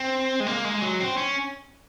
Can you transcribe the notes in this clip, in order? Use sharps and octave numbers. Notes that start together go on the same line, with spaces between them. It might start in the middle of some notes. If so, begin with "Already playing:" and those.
Already playing: C4
G#3
A#3
G#3
F#3
C4
C#4